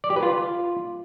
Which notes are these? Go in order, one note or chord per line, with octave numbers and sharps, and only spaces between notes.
D5
G4
B4
F4